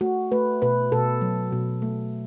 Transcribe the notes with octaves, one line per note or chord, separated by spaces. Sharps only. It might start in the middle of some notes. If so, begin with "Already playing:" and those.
A3 F#4
A3 B4
B2 B4
B2 A4
F#3
B2
A3